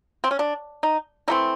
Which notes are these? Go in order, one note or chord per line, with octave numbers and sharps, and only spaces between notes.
C4
C#4
D4
D#4
E3 A3 C4 D#4